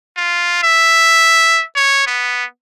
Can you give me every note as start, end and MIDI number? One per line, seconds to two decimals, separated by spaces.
0.17 0.61 65
0.63 1.63 76
1.76 2.06 73
2.07 2.45 59